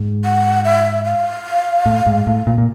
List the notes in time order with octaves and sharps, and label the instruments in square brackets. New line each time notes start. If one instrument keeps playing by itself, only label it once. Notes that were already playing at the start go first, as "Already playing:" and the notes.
Already playing: [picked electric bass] G#2
[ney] F#5
E5
F5
[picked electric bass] A2
G#2
A2
A#2
A#2